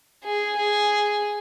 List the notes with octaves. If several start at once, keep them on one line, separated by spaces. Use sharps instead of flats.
G#4
G#4